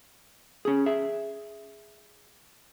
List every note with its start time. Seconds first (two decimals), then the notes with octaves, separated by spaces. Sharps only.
0.65 C#4 G#4
0.86 G#4 E5